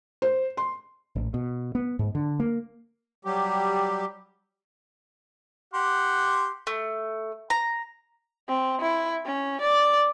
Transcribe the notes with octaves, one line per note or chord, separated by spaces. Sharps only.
C5
C6
A1
B2
B3
G#2
D3
A#3
F#3 G3 G4
G4 F#5 C6
A3
A#5
C4
E4
C#4
D5